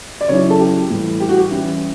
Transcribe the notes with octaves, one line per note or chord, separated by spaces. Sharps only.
D5
C#3 F#3 C#4 E4 C#5
A4
G4
A2 E3 G3
G4
F#4
G4
E3 G3 C#4 E4